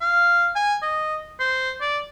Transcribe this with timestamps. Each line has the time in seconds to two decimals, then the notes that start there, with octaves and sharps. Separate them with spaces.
0.01 F5
0.56 G#5
0.82 D#5
1.40 C5
1.81 D5